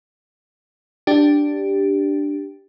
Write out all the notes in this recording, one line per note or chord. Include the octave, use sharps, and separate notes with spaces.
D4 G4